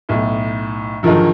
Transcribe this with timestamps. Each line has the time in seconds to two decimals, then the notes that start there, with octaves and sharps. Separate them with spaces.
0.09 B1 A2
1.03 G#2 D3 D#3 F3 F#3